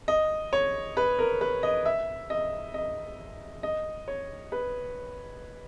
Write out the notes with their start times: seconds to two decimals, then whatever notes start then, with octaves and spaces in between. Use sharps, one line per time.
0.08 D#5
0.53 C#5
0.97 B4
1.19 A#4
1.41 B4
1.63 D#5
1.85 E5
2.30 D#5
2.74 D#5
3.63 D#5
4.08 C#5
4.52 B4